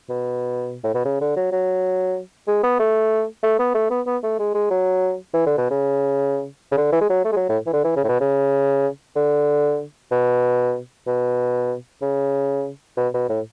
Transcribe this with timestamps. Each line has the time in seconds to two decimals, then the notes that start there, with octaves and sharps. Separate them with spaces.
0.09 B2
0.84 A2
0.94 B2
1.05 C#3
1.21 D3
1.36 F#3
1.52 F#3
2.47 G#3
2.63 B3
2.79 A3
3.43 A3
3.59 B3
3.74 A3
3.90 B3
4.06 B3
4.23 A3
4.39 G#3
4.54 G#3
4.70 F#3
5.34 E3
5.46 D3
5.57 B2
5.70 C#3
6.72 C#3
6.77 D3
6.92 E3
7.01 G#3
7.09 F#3
7.25 A3
7.32 G#3
7.36 F#3
7.49 A2
7.66 E3
7.73 D3
7.84 E3
7.96 C#3
8.04 A2
8.08 B2
8.20 C#3
9.16 D3
10.11 B2
11.07 B2
12.02 C#3
12.97 B2
13.14 B2
13.29 A2